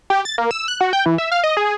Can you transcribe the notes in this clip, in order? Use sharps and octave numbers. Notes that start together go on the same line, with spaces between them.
G4
A6
A#3
E6
F#6
F#4
G5
E3
E5
F5
D#5
G#4